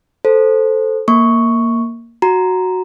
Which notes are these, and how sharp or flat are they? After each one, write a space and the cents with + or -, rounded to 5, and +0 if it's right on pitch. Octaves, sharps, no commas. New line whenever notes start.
A4 +0 C5 +0
A#3 -5 C#6 +0
F#4 +0 A#5 +0